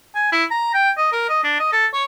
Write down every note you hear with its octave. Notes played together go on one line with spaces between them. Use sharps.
G#5
E4
A#5
G5
D#5
A#4
D#5
D4
D#5
A4
C#5